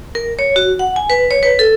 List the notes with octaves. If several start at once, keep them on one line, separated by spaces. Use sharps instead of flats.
A#4
C#5
F#4
F#5
G#5
B4
C#5
B4
A4